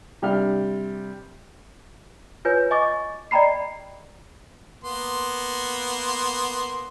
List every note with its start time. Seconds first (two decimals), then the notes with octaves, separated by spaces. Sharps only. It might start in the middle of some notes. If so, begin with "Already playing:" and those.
0.22 C3 G3 D4 F5 F6
2.45 F4 B4 C#5 G#5 G6
2.71 D#5 G#5 C#6 D6 A6
3.31 D5 D#5 G5 A#5 B5 C7
4.84 A#3 B3 C6